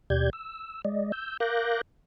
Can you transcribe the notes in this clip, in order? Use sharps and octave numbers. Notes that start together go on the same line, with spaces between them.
D#2 B2 G4 D5 G6 G#6
E6
G#3 D5 D#5
E6 G6
A#4 F5 D6 F#6 G6 A#6